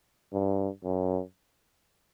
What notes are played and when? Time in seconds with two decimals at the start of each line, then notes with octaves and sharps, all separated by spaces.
0.33 G2
0.84 F#2